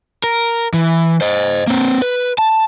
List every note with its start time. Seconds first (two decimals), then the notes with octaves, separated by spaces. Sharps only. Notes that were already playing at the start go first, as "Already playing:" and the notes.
0.24 A#4
0.74 E3
1.21 C5 D#5
1.67 A#3 C4
2.02 B4
2.38 A5